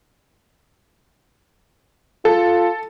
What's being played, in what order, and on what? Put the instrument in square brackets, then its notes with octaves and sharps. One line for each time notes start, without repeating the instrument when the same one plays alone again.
[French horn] F4 [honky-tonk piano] A4